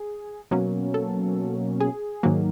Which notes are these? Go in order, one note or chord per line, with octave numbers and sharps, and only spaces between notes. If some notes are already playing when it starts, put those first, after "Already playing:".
Already playing: G#4
B2 F#3 A#3 C#4
A4
G#4
G#2 D#3 F#3 A#3